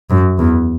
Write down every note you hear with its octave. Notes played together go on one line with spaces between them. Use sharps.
F#2
E2